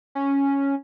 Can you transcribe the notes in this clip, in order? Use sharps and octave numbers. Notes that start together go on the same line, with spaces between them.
C#4